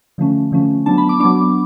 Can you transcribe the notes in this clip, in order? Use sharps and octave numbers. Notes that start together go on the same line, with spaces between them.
D3 F3 A3 C#4
D3 F3 A3 C#4
F#3 B3 D4 A5
B5
D6
F#3 B3 D4 D6